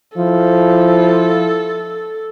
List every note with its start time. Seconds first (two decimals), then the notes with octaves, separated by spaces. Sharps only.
0.17 F3 E4 A4